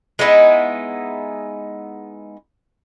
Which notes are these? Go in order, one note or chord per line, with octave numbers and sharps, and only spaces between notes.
G#3 B3 D#4 E4